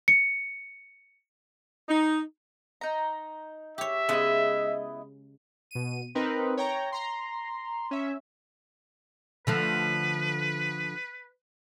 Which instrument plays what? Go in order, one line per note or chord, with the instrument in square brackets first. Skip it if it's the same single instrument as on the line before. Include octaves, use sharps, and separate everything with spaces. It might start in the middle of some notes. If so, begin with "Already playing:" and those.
[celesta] C#7
[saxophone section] D#4
[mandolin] D#4 A#5
[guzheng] G4 C#5 [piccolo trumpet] E5
[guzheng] C#3 G#3 [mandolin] B3 E4 D#5
[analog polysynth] B2 D#7
C4 D#4 A#4 B4
C#5 G5 A#5
A#5 C6
C#4 E5
[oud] D3 F3 A3 [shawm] B4